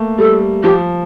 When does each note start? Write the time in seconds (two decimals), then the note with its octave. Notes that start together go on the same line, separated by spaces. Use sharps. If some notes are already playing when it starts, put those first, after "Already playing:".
Already playing: A3 A#3
0.18 G3 A4
0.63 F3 G4